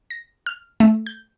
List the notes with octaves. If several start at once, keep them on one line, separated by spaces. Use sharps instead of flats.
A#6
F6
A3
G6